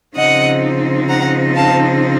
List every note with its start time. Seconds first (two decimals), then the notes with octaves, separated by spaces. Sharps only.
0.15 C#3 F3 C4 D#4 D#5 F#5
1.08 F#5 A#5
1.54 F5 A5